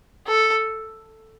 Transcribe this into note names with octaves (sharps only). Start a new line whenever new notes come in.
A4